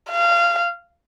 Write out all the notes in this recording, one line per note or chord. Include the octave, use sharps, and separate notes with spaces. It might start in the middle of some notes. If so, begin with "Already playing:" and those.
F5